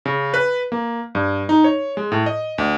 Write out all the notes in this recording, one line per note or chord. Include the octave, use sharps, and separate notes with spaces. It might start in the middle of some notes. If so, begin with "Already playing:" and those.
C#3
B4
A#3
G2
D#4
C#5
G#3
A2
D#5
D2